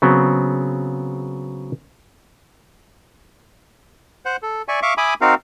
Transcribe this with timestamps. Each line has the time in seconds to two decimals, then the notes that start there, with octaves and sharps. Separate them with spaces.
0.02 C#3 F#3 B3 C4
4.25 C5 F#5
4.42 A4
4.68 D5 E5 G#5 C#6
4.82 E5 F5 C#6 D6
4.98 E5 G#5 B5 D6 D#6
5.21 C4 D#4 F#4 A#4 F5